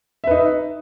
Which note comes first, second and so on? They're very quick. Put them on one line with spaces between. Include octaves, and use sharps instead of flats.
E5 B4 D#4